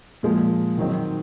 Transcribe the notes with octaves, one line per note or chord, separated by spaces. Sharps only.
A#2 F3 G#3
D#3 F#3 C4 D#4